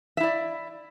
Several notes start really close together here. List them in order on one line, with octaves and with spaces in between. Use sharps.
E5 E4 D5